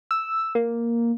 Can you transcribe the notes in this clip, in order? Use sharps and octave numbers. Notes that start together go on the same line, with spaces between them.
E6
A#3